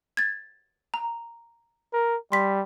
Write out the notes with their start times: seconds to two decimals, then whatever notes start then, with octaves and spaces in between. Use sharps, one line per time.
0.17 G#6 A6
0.94 A#5
1.93 A#4
2.32 G3 C6 B6